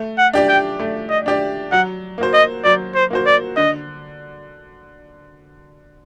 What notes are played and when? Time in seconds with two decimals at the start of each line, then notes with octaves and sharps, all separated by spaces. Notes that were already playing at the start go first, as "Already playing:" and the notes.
Already playing: A3
0.18 F#5
0.33 D4 G4 D5
0.49 G5
0.80 A3
1.10 D#5
1.26 D4 G4 D5
1.72 F#3 F#5
2.18 A#3 F#4 C5
2.34 D#5
2.64 F#3 D5
2.95 C5
3.10 A#3 F#4 C5
3.26 D5
3.57 D3 D#5